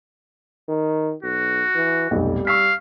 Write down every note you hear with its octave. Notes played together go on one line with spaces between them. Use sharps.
D#3
B1 F#4
E3
F1 B1 G3
F5 C#6 E6 B6